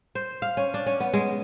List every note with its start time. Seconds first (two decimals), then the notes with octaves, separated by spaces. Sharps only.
0.15 C5
0.42 F5
0.57 C#4
0.74 D4
0.86 C#4
1.00 B3
1.13 G#3